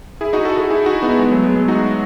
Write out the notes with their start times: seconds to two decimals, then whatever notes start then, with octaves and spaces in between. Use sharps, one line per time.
0.21 E4 G#4
0.33 D#4 F#4
0.45 F#4 A4
0.57 F#4 A4
0.70 E4 G#4
0.86 D#4 F#4
1.02 B3 D#4
1.19 G#3 B3
1.31 F#3 A3
1.43 G#3 B3
1.56 G#3 B3
1.68 D#4 F#4